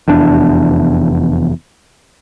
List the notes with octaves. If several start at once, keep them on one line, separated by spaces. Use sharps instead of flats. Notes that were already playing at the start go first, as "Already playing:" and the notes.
F1 E2 D4